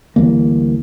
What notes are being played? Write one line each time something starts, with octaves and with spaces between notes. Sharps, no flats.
D2 E3 G3 A#3